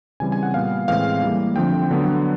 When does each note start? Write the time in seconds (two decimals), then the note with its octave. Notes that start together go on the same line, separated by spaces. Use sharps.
0.20 C#3 E3 G3 C4 G#5
0.32 G#5
0.43 F#5
0.54 A#2 G3 B3 F5
0.88 A2 E3 G#3 C4 F5
1.22 E3 G3 A#3
1.56 D3 F3 A3 C4 G5
1.91 D3 F#3 B3